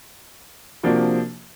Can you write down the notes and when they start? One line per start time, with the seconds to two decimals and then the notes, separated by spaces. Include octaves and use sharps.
0.83 C3 F3 A#3 D4 F#4